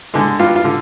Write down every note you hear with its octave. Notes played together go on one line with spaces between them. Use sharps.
D3 G#3
G2 F4
F4
D3